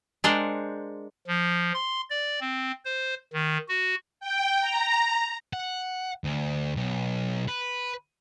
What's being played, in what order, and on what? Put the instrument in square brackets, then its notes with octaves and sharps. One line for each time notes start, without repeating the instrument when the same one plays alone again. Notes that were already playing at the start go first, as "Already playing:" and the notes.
[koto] G#3 D4 A#4 C5 F#5 G5
[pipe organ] F3
C6
D5
C4
C5
D#3
F#4
[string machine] G5
A#5
[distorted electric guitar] F#5
D2
B1
B4